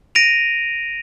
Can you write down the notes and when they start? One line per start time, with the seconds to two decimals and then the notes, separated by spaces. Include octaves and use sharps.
0.15 A#6 D7 D#7 F7